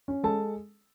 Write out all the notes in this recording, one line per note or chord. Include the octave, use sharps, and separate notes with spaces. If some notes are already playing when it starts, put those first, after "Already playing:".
C#4
G#3 A4 A5